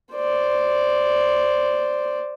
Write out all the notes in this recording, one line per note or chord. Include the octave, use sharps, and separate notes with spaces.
C5 D5